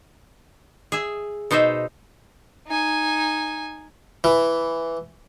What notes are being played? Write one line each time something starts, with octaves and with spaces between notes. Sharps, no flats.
G#4 E5
B2 D#4 C5 D#5 E5
D#4 G#5
E3